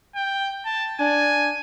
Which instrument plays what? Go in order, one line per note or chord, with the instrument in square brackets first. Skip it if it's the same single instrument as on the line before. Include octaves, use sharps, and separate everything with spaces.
[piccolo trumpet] G5
A5
[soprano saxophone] D4 [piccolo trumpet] G#5